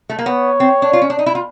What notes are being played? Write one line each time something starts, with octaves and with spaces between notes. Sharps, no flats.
A3
A#3
B3 C#5
C4
D4
F4
C#4
D4
D#4
E4
F4